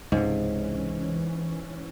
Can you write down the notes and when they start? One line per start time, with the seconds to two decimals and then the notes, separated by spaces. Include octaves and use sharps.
0.12 C#2 G#2 C3 E3 C#4